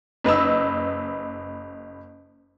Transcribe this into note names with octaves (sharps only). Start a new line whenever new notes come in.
F#1 B4 D#5 E6